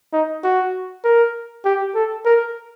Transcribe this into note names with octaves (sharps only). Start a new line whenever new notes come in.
D#4
F#4
A#4
G4
A4
A#4